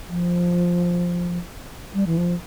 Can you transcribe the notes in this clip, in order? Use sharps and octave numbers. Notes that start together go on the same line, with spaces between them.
F3
G3
E3
F3